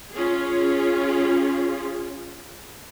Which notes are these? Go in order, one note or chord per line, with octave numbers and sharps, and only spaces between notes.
C#4 F4 G#4